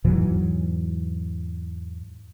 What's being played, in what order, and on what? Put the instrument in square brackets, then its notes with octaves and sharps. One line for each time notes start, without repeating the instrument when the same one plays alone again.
[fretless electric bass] E2 G#2 E3 F#3